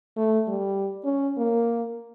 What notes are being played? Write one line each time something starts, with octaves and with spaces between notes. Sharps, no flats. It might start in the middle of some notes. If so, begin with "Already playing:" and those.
A3
G3
C#4
A#3